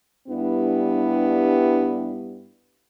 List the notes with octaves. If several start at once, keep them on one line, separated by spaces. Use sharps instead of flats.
G2 G3 B3 D4 E4